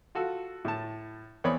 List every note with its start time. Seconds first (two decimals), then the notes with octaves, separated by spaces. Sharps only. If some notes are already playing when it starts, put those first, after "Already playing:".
0.15 F4 F#4 A4
0.65 A2 A5
1.44 E2 C4 C#5 D5 B5 D#6